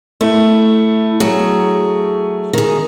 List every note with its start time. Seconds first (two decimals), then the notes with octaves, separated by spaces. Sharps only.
0.21 A3 E4
1.20 F#3 G#4
2.53 D#3 G#4